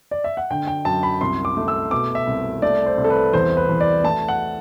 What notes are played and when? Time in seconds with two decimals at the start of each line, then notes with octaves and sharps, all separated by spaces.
0.11 D5
0.24 E5
0.37 F#5
0.51 D3 G5
0.67 G5
0.85 F#2 A5
1.03 B5
1.21 C2 C6
1.45 D6
1.57 A3
1.68 E6
1.91 B2 D6
2.15 E5
2.27 C2
2.62 A3 D5
2.86 C5
2.97 C2
3.04 A4
3.10 B4
3.33 E2 C5
3.57 B4
3.69 E2
3.81 D5
4.04 A3 A5
4.28 F#5